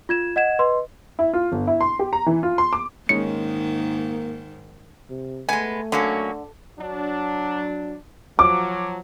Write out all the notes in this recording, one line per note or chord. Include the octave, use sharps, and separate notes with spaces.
F4 G#6 E7
D#5 F#5 G#6 E7
B4 D#5 C6
E4
F4
G1
E4
C6
G4
A#5
E3
F4
C6
D6
G#2 D#3 G#3 A#3 C#4 D#4 C#7
C3
G#3 A3 B3 G#5
D3 F#3 A#3 C#4
F#3 D4
F3 F#3 D6